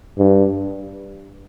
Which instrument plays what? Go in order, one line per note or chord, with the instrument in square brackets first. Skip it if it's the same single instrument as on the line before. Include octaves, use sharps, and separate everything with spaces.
[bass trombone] G2